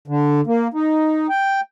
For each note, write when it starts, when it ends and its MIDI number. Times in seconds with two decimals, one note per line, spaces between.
0.08 0.41 50
0.47 0.68 58
0.74 1.27 63
1.29 1.61 79